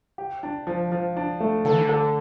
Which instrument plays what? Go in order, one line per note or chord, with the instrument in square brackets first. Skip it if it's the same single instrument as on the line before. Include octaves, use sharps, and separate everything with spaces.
[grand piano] G4
D4
F3
F3
D4
A3
[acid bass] D3 [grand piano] A4
[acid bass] E3
D3
[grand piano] A4